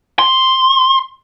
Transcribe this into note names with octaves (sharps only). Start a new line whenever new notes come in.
C6